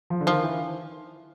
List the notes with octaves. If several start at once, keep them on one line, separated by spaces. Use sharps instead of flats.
F3
D3
D#3 F3
E3